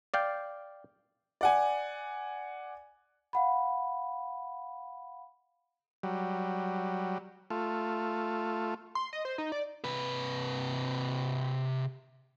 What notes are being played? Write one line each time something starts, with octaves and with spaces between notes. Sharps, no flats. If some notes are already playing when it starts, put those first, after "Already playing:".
D5 F5 G5
D5 F#5 G#5
F5 F#5 B5
F#3 G3
A3 F4
C6
D#5
C5
D#4
D5
C3 B4